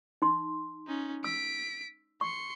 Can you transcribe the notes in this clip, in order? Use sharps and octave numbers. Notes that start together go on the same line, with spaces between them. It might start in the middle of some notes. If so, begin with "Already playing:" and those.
D#4 C6
C#4 D#4
E6 B6 D7
C6 C#6 C#7